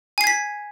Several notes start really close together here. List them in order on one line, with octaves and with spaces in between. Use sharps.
G#5 C7 G#6 B6